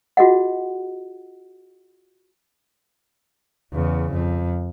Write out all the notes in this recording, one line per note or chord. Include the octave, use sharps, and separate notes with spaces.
F4 F#4 G#4 D#5 F#5
E2 C#3
F2